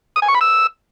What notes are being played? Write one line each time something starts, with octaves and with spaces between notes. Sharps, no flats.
D#6
G#5
C#6
B5
E6